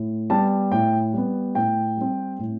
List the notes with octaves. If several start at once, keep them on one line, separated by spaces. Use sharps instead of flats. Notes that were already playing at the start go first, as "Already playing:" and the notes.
Already playing: A2
G3 B3 A5
A2 G5
G3 B3
A2 G5
G3 C4
A2